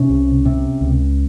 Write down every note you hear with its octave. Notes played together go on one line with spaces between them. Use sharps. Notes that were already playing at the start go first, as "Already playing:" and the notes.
Already playing: C3 C#4
C2
C3
C#2